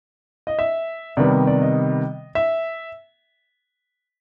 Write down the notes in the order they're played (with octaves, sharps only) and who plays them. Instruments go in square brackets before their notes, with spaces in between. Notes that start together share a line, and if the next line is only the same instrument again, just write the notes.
[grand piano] D#5
E5
C3 D#3 G3 B3 D5
D5
D#5
E5